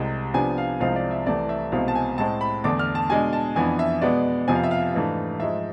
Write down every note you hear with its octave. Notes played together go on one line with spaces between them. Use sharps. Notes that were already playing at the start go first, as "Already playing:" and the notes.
Already playing: C2 C3 G#3
C3 F3 B3 D4 G#5
F5
C2 C3 F3 G#3 C4 F5
D5
E5
C2 C3 E3 A3 D5
E5
C2 B2 G#3 C4 F5
A5
G#5
A2 G#3 C4 A5
B5
E2 D3 A3 D4 D6
F6
A5
B2 G#3 D4 G#5
A5
F2 E3 B3 D4 G#5
E5
B2 G#3 B3 D5
F2 C3 F3 B3 G#5
F5
E5
F5
G#2 E3 A3 D4
G#2 F3 G#3 E5